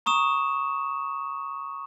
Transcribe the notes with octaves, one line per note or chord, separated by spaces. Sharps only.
A#5 C#6 D#6 E7